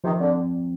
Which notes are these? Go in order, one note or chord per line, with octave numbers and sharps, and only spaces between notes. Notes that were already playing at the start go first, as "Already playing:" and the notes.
C3 D#3 F3
D3 C4